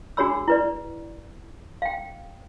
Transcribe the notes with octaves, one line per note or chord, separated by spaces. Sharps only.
D4 F#4 G#4 C#5 B5 E6
E4 B4 D5
F5 G5